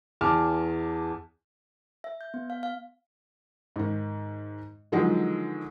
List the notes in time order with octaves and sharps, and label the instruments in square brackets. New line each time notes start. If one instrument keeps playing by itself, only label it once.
[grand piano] E2 G#5 A5 D6 F6
[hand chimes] E5
G6
B3
F5
F5
[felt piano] G#2 D#3
D3 D#3 F3 F#3 G#3